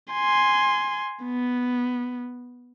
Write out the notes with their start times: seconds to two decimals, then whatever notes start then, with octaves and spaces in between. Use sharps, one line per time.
0.13 G#5 C6
1.24 B3